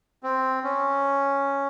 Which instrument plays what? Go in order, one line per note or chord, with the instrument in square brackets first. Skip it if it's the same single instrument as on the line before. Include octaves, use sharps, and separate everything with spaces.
[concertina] C4
C#4